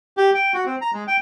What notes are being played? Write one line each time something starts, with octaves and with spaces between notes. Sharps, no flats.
G4
G5
F#4
C4
A#5
G#3
G5